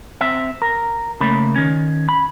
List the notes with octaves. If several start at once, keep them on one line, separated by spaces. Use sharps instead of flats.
C4 E5
A#4
C#3 A3 A#3 B5
D#3 C#4
B5